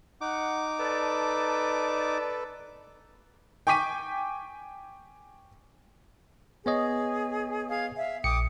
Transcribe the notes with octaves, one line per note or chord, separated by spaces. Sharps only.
D#4 F#5 D6
A4 B4 D5 A5
G5 G#5 C#6 D6 B6 D#7
B3 G#4 C#5 D#5
G#4 F5 G#6
E5 F5
A#1 G5 D6 D#6 C#7